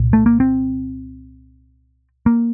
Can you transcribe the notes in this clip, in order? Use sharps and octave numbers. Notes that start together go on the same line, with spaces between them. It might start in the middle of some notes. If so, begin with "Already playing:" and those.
Already playing: C2 A#2
A3
A#3
C4
A#3